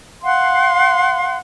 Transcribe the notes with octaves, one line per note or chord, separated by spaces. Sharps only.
F5 F#5 C6